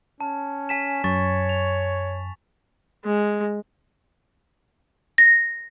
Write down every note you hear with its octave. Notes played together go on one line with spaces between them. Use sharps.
C#4 A5
G#5 B6 E7
F#2 C#5 C#6 A6
F7
G#3
A#6